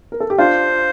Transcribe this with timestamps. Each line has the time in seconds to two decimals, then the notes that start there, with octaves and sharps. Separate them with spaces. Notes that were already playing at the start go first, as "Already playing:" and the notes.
0.12 A#4
0.20 A4
0.30 G4
0.38 D4 F4 C5